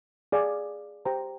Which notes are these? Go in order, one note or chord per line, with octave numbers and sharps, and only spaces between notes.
G#4 D5 F5 G#5
G4 C5 G5 A#5